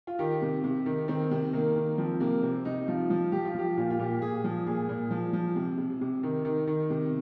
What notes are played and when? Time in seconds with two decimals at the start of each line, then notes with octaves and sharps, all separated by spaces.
0.07 F4
0.19 D#3 G4
0.42 C3
0.64 C3
0.86 D#3
1.08 D#3 C4
1.31 C3
1.53 D#3 A#3
1.76 D#3
1.98 F3 C4
2.20 C3 A#3
2.43 C3 C4
2.65 C3 D#4
2.88 F3 F4
3.10 F3
3.32 F3 G4
3.45 F4
3.55 F3 G4
3.77 A#2 F4
3.90 F4
3.99 A#2 G4
4.21 A#2 G#4
4.44 F3
4.67 A#2 G#4
4.89 A#2
5.11 F3
5.33 F3
5.56 C3
5.78 C3
6.01 C3
6.23 D#3
6.45 D#3
6.67 D#3
6.90 C3